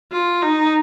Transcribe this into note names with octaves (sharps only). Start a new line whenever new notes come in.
F4
D#4